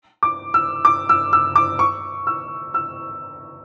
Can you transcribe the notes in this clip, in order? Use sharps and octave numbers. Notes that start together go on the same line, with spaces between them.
D6
E6
D6
E6
E6
D6
C#6
E6
E6